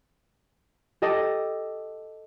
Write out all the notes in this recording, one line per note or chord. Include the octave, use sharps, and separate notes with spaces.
G4 A4 D#5 A5 D6